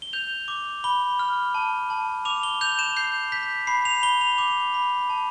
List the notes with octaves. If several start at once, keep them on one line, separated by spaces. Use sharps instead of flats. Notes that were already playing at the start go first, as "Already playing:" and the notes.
G7
G6 F7
D6
B5 G7
F6
A5
A5
D6 F7
G7
G6 F7
E7
G6 C7
G6 B6
B5 C7
F7
B5 G7
F7
D6 F7
B5
A5